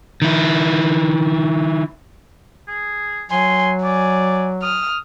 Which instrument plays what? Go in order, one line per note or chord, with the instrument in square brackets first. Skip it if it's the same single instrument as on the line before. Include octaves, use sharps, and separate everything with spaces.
[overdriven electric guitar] D#3 E4
[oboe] G#4
[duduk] F#3 [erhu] G#5 [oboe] C6
[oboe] D5 [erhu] G#5
[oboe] D#6 [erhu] F6